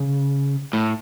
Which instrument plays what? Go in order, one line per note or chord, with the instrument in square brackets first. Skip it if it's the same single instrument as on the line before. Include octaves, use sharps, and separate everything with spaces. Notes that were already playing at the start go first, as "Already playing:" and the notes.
Already playing: [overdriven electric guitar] C#3
A2